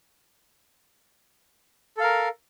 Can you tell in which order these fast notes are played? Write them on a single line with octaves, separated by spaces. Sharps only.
A4 F5 A#4